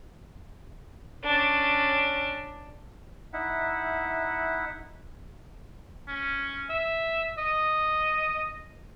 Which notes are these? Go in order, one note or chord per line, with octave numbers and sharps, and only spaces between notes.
C#4 D4
D#4 E4 E5 F#5
C#4
E5
D#5